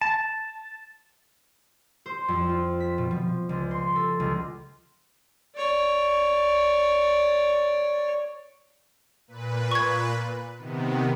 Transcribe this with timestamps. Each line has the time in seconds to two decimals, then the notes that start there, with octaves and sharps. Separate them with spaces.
0.01 A5
2.06 C5
2.28 F2
2.49 F4
2.80 B6
2.98 B2
3.11 F3
3.49 C#2
3.71 C6
3.96 A4
4.20 C#2
5.56 C#5 D5
9.28 A#2 B4
9.71 C#6 G#6
10.58 C3 D#3 B3